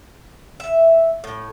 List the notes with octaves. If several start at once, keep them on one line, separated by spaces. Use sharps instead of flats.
E5
A2